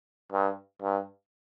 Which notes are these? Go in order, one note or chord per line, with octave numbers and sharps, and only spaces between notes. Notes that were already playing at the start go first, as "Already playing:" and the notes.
G2
G2